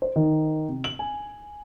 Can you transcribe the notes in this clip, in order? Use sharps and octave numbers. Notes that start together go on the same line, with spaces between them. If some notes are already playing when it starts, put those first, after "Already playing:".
C5
D#3
C3
F#7
G#5